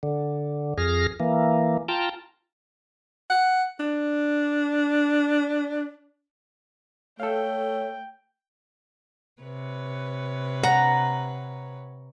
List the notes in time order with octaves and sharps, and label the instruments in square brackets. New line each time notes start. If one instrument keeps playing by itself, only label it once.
[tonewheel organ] D3
F2 G#4 F6 A#6
E3 A#3
F4 G5 A5 A#5
[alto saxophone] F#5
D4
[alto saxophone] A3 [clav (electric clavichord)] A4 F5 [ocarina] C#5 [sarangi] G5
[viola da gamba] C3 B4 C#5
[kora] F#5 [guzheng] A#5